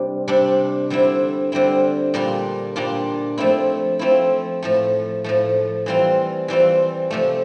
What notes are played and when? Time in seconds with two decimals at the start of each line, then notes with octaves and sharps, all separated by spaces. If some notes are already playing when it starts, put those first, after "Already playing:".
Already playing: C3 G3 D4
0.28 C3 G3 D4
0.90 D3 G3 C4 E4
1.52 D3 G3 C4 E4
2.14 A#2 G3 D4 F4
2.76 A#2 G3 D4 F4
3.38 F3 A3 C4 E4
3.99 F3 A3 C4 E4
4.62 A2 F3 A3
5.24 A2 F3 A3
5.86 E3 G3 C4 F4
6.48 E3 G3 C4 F4
7.10 C3 F3 A3